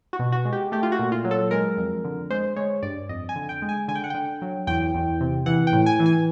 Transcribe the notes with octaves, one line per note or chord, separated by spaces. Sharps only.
F#4
B2
F#4
G#3
G4
A3 G4
F4
F#4
A#2
F4
F#3
A4
G#3 A#4
F2
D3
G#3 C5
G#3 C#5
G2 D5
F2 D#5
G#5
D3
G5
G#3
G#5
D3 G#5
G5
F#5
D3 G5
F#3
E2 G5
E2
C3
E3 F#5
G5
A2
G#5
E3
G#5